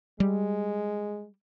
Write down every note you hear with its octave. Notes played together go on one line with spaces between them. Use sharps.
G3 G#3